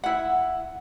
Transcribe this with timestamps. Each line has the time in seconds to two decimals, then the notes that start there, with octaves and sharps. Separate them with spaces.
0.04 E4 F#5